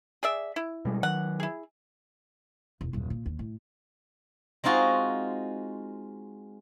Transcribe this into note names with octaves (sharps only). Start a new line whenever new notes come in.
G#4 D5 E5
E4
B2 G3 G#3
D#3 F#3 F#5
E4 G#4
E1
D#1 F#2
A#2
D#2
A2
G#3 C4 D#4 F4 F#4